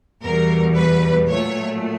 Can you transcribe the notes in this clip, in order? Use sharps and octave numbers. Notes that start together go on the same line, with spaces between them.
E2 B2 G3 A#4
B4
A#2 F#3 A3 C#5